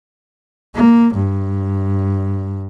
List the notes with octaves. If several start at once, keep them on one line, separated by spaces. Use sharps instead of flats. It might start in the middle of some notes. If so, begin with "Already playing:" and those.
A#3
G2